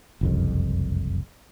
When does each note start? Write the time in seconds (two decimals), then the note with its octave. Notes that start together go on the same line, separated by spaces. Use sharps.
0.21 F#1 C2 F2